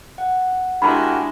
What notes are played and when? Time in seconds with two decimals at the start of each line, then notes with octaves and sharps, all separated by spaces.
0.18 F#5
0.82 G#3 D4 E4 F#4 G4 A#4 G#5 B5